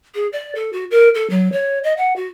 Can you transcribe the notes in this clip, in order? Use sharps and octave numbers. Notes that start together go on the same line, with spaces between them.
G#4
D5
A4
F#4
A#4
A4
F#3
C#5
D#5
F#5
F#4